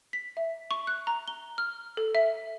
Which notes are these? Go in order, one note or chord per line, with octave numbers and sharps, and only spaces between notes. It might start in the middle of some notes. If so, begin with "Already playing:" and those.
B6
E5
C#6
F#6
A#5
G7
F6
A4
E5